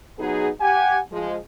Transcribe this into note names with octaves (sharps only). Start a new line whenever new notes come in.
F#3 B3 D#4 F#4 G#4
G4 F#5 G#5
F3 G#3